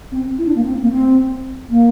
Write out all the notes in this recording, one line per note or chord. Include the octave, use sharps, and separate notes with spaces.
C4
E4
D4
A#3
C4
A#3
C4
A#3